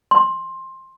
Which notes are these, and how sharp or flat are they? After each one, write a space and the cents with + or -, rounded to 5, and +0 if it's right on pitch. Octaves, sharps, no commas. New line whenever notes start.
C6 +15